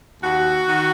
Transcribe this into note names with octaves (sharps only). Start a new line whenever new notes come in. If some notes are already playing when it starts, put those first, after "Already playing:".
D#2 F#4
D#3